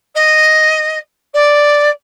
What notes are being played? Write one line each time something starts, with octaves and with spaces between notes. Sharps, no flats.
D#5
D5